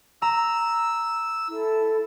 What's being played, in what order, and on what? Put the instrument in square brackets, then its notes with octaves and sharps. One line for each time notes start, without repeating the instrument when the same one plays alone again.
[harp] A#5 [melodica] E6
[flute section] E4 A4